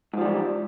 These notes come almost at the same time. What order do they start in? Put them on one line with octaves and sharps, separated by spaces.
G#2 F3 G3 E3